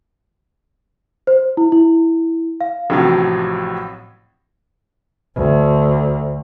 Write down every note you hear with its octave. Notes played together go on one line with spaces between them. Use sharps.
C5
E4
E4
F5
A1 A2 C3 F3 F#3
D2